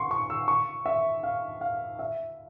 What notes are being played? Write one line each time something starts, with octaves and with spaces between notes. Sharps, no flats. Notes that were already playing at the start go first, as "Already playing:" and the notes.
Already playing: C6 C#6
C#6
E6
C#6
E5
F5
F5
E5